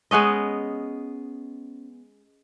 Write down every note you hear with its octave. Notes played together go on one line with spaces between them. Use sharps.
G#3 B3 C#4 D#5